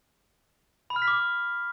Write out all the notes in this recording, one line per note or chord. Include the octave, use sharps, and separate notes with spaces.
B5
F6
B6
D6